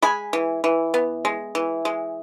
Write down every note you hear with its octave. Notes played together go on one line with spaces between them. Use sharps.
G#3 G#5 B5
E3
E3
B3
G#3
E3
G#3